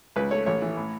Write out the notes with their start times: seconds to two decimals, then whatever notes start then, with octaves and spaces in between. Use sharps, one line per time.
0.16 C#2 B4
0.31 A3 C#5
0.46 A1 C#5
0.62 E3
0.77 A2